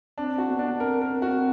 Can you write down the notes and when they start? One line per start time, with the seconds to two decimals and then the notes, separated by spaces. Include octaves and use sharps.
0.18 C4 D4
0.38 F#4
0.49 B3
0.59 D4
0.80 C4 A#4
1.02 A#4
1.11 C4
1.22 F#4